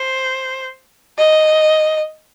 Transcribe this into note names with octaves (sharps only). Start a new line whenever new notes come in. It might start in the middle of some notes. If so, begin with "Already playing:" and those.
Already playing: C5
D#5